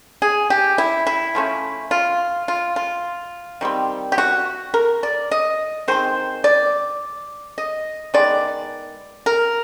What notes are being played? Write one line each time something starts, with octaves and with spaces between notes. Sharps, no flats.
G#4
G4
E4
E4
F3 A3 C#4
F4
F4
F4
D#3 G3 C4
G4
F#4
A#4
D5
D#5
D#3 G#3 C4 C5
D5
D#5
D#3 G#3 B3 D5
A#4